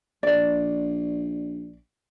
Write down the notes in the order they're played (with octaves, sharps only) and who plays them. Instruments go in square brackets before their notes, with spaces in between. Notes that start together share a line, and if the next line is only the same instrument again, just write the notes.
[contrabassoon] A#1 [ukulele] D5